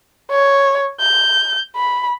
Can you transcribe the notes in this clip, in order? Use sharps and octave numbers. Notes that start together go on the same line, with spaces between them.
C#5
G6
B5